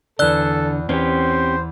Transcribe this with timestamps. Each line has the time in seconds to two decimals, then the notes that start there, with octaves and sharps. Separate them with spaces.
0.19 E2 D3 A4 D5 E6 F#6
0.89 E2 C4 C#4 G4 C5